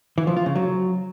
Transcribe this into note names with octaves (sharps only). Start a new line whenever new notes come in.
E3
F3
F4
C#3
F#3